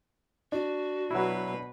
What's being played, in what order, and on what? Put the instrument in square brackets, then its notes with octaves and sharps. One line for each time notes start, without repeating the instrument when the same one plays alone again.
[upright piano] D4 [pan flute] F#4
[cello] B2 B4 [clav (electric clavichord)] F#3 E4